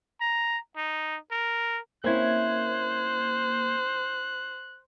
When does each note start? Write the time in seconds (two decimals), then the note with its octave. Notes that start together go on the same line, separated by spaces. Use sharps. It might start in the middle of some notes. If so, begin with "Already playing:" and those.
0.21 A#5
0.77 D#4
1.32 A#4
2.04 A#3 C4 C#4 E4 C5 F#6 G#6